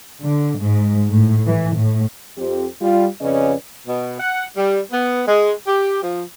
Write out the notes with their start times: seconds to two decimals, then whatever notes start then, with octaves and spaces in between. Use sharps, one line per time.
0.22 D3
0.59 G#2
1.08 A2
1.45 E3
1.76 A2
2.38 F2 C4 G4
2.82 G3 F4
3.21 F2 C#3 C#4 B4 D5 D#5
3.87 B2
4.20 F#5
4.56 G3
4.91 B3
5.27 G#3
5.66 G4
6.02 F3